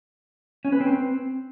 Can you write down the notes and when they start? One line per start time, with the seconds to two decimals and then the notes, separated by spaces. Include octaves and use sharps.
0.65 C#4
0.72 B4
0.80 C4